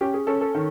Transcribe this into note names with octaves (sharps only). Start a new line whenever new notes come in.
C#4 G4
G#4
C#4 A4
A4
D#3